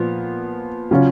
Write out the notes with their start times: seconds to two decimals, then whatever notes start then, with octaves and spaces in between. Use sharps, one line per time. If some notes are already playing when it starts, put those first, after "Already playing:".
Already playing: A#2 F3 B3
0.91 C#3 F#3 C#4 F4